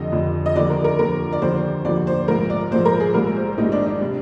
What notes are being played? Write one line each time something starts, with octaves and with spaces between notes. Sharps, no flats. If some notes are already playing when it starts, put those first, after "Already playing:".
Already playing: F1 F2 D3 F3 D#5
F1 F2 D3 F3
D#5
D#2 D3 F3 D5
A#4
A#4
D#2 D3 F3 A#4
D5
D#2 D3 F3 C5
D#2 D3 F3 D5
C5
A#1 G#2 F3 A#4
D5
A#1 G#2 F3 C5
A#4
G#4
A#1 G#2 G3 A#4
C5
A#1 G#2 G3 D#4
D4
D4
C3 G3